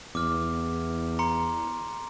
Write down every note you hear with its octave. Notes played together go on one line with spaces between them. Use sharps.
E2 D6 F6
A#5 C6 C#7